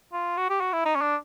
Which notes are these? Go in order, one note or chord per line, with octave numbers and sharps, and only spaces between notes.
F4
F#4
G4
F#4
E4
D#4
C#4
D4